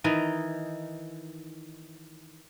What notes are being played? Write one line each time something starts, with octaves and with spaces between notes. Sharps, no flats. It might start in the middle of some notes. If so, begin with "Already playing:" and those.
D#3 E3 D#4